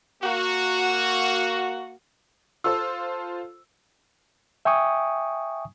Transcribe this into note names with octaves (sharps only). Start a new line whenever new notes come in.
A#3 F#4
F4 A4 C5 E6
E5 G5 G#5 C#6 D#6